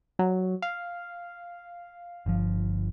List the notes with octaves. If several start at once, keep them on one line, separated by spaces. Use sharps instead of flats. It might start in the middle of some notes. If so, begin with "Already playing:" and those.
F#3
F5
G1 F3